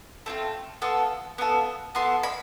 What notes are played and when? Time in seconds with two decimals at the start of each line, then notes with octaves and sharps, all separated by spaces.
0.26 A3 C4 F4
0.82 B3 F4 A4
1.38 B3 F4 A4
1.95 B3 F4 A4 C6
2.23 B5